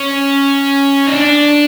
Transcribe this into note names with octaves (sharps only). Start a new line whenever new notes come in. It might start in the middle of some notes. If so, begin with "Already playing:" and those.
Already playing: C#4
D#4
D4